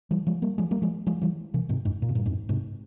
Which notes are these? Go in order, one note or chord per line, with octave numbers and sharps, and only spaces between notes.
E3 G3
F3 G#3
G3 A#3
F3 G#3
G3 A#3
F3 G#3
F3 G#3
E3 G3
C3 E3
G#2 C3
F2 G#2
A#2
C3
G2 A#2
F2 G#2
G#2 C3